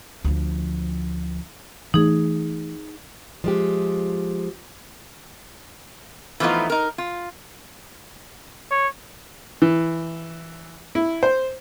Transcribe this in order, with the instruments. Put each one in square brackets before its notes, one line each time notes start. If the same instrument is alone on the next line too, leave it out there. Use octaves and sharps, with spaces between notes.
[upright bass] D2 F3
[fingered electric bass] E3 A3 [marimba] D#4 G#4
[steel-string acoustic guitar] F3 G#3 G4
[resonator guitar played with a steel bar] E3 F3 A3 B3 D#4 F4
D#4 A#4
F4
[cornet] C#5
[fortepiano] E3
E4
C5